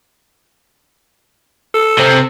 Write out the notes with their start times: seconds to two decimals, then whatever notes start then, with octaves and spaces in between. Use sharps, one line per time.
1.74 A4
1.99 C3 C4